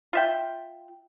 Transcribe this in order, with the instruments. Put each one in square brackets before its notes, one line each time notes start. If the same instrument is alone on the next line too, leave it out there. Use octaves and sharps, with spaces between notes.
[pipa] F4 E5 G5